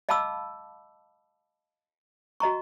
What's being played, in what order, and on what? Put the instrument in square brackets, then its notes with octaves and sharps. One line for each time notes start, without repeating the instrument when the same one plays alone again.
[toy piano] D#5 F5 A5 B5 D6 E6
F#4 D#5 A#5 C#6